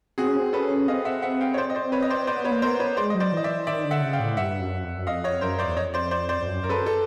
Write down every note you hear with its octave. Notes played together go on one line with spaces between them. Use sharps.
C4 F#4 G#4
C#4
C4
C#4 A4 B4
C4 D#5 F5
E5 F#5
E5 F#5
F5 G5
C#5
C5 D5
D#5
C5 D5
B4 C#5
D#5
C5 D5
B3 C5 D5
B4 C#5
A#3
B3 A#4 C5
B4 C#5
G#3 C5 D5
F#3 D#5
C5 D5
E3 D#5
D5 E5
E3
D#3 D5 E5
D3
E5 F#5
C#3
F5 G5
A2
G2 E5 F#5
F#2
F2
F#2
F2 D#5 F5
C#5 D#5
F#2 A#4 C5
C5 D5
E2
F2 C#5 D#5
C5 D5
C5 D5
C5 D5
F2
F#2
F#2 A#4
A4 B4
A4